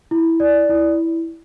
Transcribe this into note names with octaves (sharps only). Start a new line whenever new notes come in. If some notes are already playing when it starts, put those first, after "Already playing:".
E4
D5
E4